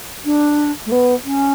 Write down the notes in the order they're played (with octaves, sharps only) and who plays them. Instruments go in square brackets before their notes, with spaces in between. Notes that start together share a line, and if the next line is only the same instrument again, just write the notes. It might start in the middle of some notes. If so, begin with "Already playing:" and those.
[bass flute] D4
A3
B3
C#4